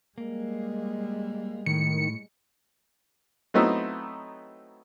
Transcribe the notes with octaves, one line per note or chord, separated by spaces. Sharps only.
G3 G#3 A#3
A2 D#3 C#7
F#3 A3 B3 C4 D#4 E4